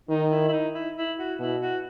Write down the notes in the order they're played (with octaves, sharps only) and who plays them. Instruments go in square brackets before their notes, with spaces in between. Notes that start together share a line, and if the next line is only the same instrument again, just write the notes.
[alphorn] D#3 [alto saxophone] D#4
[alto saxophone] E4
E4
D#4
E4
E4
F#4
[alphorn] B2 [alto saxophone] E4
[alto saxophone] F#4